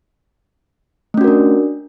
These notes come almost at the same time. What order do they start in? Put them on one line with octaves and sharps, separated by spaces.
A3 C#4 F#4 A#4 D4